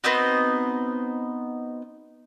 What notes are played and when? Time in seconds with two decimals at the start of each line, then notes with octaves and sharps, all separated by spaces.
0.04 B3 C4 D#4 F#4